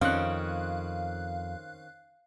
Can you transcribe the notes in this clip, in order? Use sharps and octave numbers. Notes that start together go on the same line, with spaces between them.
F2 D#3 C4 C#4 F5 F#6